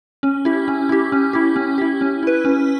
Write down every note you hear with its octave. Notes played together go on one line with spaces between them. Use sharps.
C#4
E4 G4
C#4
E4 G4
C#4
E4 G4
C#4
E4 G4
C#4
E4 B4
C#4